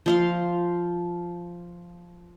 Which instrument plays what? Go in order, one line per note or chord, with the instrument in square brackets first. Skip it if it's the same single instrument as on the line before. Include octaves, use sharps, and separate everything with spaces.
[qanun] F3 F5 C6